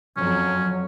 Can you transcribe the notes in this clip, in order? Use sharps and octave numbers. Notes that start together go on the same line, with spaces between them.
F2 F#3 C#4